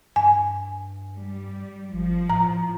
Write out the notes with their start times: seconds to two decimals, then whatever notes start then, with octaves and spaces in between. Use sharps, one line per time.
0.16 G2 G#5
1.17 G3
1.93 G#1 F3
2.30 A2 A#5